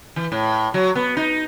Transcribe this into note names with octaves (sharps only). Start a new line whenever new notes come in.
E3
A2
F#3
B3
D#4